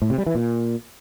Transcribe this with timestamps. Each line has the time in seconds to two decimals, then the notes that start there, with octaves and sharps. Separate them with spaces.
0.02 A2
0.10 C3
0.18 G3
0.27 E3
0.35 A#2